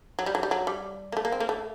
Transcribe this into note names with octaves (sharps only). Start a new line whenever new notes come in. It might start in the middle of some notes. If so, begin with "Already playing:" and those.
F#3
G3
F#3
G3
F#3
G3
A#3
A3
A#3
C4
A#3
A3